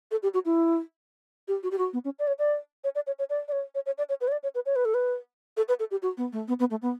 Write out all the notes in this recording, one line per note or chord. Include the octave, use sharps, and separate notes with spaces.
A4
G4
F#4
E4
G4
F#4
G4
F#4
B3
C#4
D5
C#5
D5
C#5
D5
C#5
C#5
D5
D5
C#5
C#5
C#5
D5
C#5
B4
C#5
D5
C#5
B4
C#5
B4
A4
B4
A4
B4
A4
G4
F#4
B3
A3
B3
B3
A3
B3